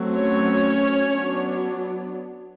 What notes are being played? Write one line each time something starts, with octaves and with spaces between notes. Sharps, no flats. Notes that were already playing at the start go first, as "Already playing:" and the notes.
Already playing: F#3 A3 C4
C#4 C#5
F#3 B3 D4